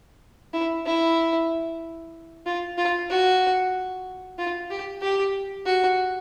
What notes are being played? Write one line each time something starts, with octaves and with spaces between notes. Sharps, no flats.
E4
E4
F4
F4
F#4
F4
G4
G4
F#4